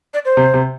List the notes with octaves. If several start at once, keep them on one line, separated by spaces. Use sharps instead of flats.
D5
C5
C3
C3